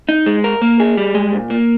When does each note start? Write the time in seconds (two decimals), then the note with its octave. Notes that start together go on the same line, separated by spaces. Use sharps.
0.09 D#4
0.26 G#3
0.44 A#4
0.62 A#3
0.80 G#4
0.97 G3
1.15 G#3
1.33 A#2
1.50 A#3